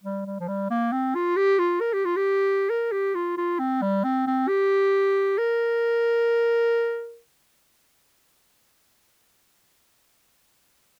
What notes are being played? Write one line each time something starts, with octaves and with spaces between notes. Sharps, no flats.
G3
G3
F3
G3
A#3
C4
F4
G4
F4
A#4
G4
F4
G4
A#4
G4
F4
F4
C4
G3
C4
C4
G4
A#4